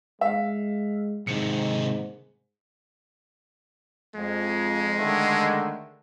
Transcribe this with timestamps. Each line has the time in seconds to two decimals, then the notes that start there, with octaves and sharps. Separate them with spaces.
0.21 G#3 E5 F5
1.27 G#2 C3 D#3 C#7
4.15 F2 G#3
4.98 D3 D#3 A3